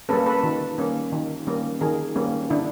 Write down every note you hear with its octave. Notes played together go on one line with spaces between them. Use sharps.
G3 A#3 C#4 A4 B4
A4 B4
D#3
G3 A#3 C#4
D#3
G3 A#3 C#4
D#3 G#4 A#4
G3 A#3 C#4
D3 D4 E4